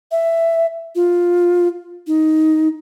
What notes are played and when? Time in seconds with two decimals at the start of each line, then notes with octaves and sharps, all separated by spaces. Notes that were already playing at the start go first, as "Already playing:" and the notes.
0.12 E5
0.95 F4
2.07 D#4